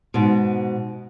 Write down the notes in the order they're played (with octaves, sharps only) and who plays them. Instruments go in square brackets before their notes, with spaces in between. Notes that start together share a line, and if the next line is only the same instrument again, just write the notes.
[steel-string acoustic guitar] G#2 B2